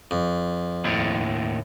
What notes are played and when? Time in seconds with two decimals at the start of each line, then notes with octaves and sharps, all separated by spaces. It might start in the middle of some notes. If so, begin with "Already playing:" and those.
0.11 F2
0.85 D#2 A2